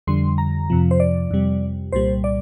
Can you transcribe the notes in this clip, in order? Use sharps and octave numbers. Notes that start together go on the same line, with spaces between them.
F2 D3 G3 C6
A#5
F2 C3 F3
C5
D5
F2 C3 G3
C2 A#2 G3 C5
D5